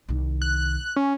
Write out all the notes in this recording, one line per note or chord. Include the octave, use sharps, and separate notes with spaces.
C2 D#3
F#6
C#4